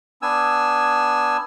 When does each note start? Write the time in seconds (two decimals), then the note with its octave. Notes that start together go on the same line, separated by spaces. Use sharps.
0.22 B3 D4 G#5 E6